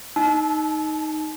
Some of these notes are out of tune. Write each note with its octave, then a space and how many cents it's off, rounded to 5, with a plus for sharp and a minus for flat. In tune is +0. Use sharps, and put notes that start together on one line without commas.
D#4 +0 A5 -40